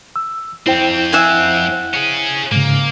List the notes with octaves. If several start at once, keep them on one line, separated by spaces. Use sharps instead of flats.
E6
F2 C4 E4 C5 G5
E5 F#5 G#5
C#4 G#4
G#2 C#3 A#3